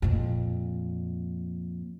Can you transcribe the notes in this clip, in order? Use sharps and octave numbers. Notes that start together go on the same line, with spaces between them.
F2 A#2